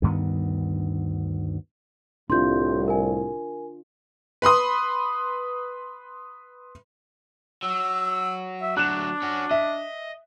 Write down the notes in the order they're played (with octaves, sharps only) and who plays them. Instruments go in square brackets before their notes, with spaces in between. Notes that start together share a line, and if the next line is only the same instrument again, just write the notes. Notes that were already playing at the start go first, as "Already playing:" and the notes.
[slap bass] D2 G2 D#3 B3
[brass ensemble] C2 A2 [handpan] D4 F4 [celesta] C6 G6
[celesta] A#4 G#5
[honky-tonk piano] B4 B5 C6 D#6
[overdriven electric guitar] F#3 [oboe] E6
[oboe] E5
[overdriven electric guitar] D2 F#3 [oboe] D4 [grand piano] F#6 E7
[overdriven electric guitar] C#4 F#4
[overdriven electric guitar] D#5 [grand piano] E5